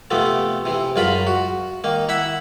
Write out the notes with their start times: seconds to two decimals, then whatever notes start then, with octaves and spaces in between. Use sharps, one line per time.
0.11 C3 F3 A3 B3
0.65 C3 E3
0.96 F#2 C#3 F4 A#4 B5
1.27 F#4
1.84 D#3 A#3
2.09 E4 E5 F#5 B5